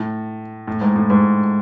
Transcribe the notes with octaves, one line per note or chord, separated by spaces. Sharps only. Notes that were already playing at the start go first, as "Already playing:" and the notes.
Already playing: A2
A2
G#2
A2
G#2